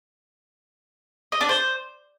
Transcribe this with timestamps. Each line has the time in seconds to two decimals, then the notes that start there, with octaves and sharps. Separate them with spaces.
1.32 D#5
1.41 D4
1.49 C5